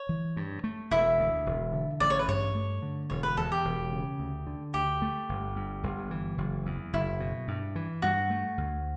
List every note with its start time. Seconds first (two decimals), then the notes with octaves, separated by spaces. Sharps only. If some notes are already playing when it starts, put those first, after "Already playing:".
Already playing: C#5
0.09 E3
0.36 G2
0.64 A3
0.91 E1 E4 E5
1.19 D2
1.46 E1
1.73 D3
2.00 A1 D5
2.10 C#5
2.19 B4
2.28 G2 C#5
2.55 A3
2.82 D3
3.10 E1 C#5
3.23 B4
3.37 E2 A4
3.52 G4
3.65 E1
3.92 C#3
4.20 D2
4.47 D3
4.74 D2 G4
5.02 A3
5.29 G1
5.56 G2
5.83 G1
6.11 E3
6.38 F#1
6.66 E2
6.93 F#1 E4
7.20 B2
7.48 G2
7.76 E3
8.02 G2 F#4
8.30 A3
8.58 D2